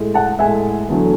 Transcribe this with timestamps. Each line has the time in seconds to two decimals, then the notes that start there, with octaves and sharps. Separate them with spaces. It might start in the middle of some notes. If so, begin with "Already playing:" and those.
Already playing: A2 G#3
0.14 F#5 A5
0.39 A2 G#3 E5 G#5
0.88 E2 D3 F#3 A3